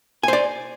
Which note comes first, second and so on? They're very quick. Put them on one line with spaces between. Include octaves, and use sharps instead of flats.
G#5 C5 D5